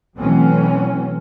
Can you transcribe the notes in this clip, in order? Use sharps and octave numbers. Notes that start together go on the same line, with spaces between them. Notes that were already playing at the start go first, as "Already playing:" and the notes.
B2 E3 F#3 A3 C4 C#4